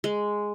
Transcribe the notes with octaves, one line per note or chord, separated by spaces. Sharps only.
G#3